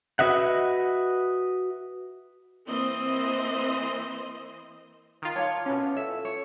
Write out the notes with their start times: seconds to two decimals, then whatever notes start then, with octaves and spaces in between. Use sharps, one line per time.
0.19 F#4 B4 D#5 E5 F#5
2.66 E3 A#3 C4 C5 D#5
5.22 D#3 F4
5.36 C#5 F5 A5 D6
5.66 B2 C#4 E4 F4
5.97 A4 E5
6.25 C#5